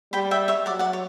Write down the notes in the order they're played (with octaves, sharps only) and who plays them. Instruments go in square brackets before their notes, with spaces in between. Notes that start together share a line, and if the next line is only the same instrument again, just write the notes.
[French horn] G3 [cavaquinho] G5 B5
[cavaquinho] E5 G5
C#5 E5
[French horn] F#3 [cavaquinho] D5 F#5
[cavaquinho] D5 F#5
C#5